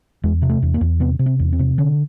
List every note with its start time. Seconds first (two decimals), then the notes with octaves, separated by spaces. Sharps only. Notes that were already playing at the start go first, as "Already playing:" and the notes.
0.24 E2 G#3
0.42 C3
0.49 A3
0.62 E2
0.74 A#3
0.81 E2
1.00 C3 B3
1.19 C3
1.26 C4
1.40 E2
1.53 C4
1.59 C3
1.78 D3 C#4